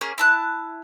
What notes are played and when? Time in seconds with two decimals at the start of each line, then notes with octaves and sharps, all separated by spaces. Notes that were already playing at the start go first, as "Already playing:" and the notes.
0.01 A#3 C#4 G#4
0.18 E4 A5 F#6